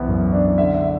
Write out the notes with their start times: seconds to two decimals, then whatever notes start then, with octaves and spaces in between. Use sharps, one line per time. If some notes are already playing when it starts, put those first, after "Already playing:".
Already playing: C2 E3 B3
0.08 F#2
0.33 D4
0.58 D3 E5
0.74 E5